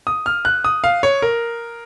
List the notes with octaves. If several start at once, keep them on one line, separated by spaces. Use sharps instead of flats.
D#6
F6
F#6
D#6
F5
C#5
A#4